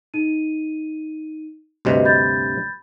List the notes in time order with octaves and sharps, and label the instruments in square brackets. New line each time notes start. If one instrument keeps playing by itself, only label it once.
[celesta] D#4 D#7
[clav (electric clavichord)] D2 G2 C3 [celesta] F#4 B4 D#5
[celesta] B5 G6 A6